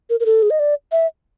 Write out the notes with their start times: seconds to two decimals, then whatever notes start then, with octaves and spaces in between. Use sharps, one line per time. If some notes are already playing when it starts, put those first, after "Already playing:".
0.10 A#4
0.20 A#4
0.26 A4
0.42 G#4
0.50 D#5
0.59 D5
0.92 E5